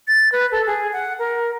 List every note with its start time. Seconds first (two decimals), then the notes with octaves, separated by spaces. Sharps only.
0.08 A6
0.32 B4
0.52 A4
0.67 G#4
0.93 F#5
1.19 A#4